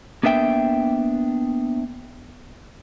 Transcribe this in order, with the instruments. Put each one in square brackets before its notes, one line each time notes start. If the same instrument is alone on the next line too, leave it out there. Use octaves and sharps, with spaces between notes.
[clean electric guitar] A#3 B3 D4 E5 G5